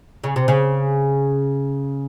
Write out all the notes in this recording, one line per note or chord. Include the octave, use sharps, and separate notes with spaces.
C#3
C3
C#3